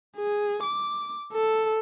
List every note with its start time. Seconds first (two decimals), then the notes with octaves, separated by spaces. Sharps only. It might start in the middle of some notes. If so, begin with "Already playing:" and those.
0.17 G#4
0.63 D6
1.33 A4